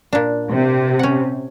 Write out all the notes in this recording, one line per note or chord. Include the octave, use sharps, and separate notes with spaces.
A#2 D4
C3
C#4 F#5